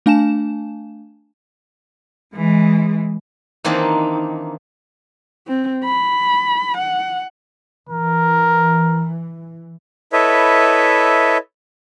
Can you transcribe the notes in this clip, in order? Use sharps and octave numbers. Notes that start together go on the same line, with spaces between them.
A3 D4 F5 G#5 A5 E7
E3 G#3
D#3 E3 A#3 C4 D4 D#4
C4
B5
F#5
E3 A#4
E4 A4 B4 C#5 D#5 E5